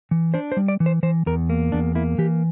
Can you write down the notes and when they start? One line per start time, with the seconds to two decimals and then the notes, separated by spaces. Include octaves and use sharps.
0.11 E3
0.34 D4 C5
0.52 C5
0.57 G3
0.68 D5
0.80 E3
0.86 C5
1.03 E3 C5
1.26 E2 A#4
1.50 A#3
1.72 E2 D4
1.95 A#3 E4
2.18 E3 G4